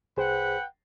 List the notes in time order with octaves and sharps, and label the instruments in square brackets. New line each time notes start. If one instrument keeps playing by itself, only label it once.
[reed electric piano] C2 G#4 C5 [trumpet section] B4 F#5 G5